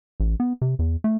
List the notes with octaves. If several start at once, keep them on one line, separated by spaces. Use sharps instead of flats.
A1
B3
C3
E2
A3